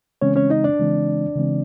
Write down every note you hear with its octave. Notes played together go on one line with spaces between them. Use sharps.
C#3 E3 G#3 C4 C#4 C#5
C#4 C#5
D#4 D#5
D4 D5
C#3 E3 G#3 C4
C#3 E3 G#3 C4